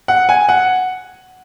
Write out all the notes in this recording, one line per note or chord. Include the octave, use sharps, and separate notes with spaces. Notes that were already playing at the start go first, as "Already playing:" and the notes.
F#5
G#5
F#5